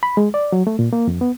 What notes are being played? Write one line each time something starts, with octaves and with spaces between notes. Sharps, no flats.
B5
G#3
D5
F#3
A3
A#2
A#3
F2
B3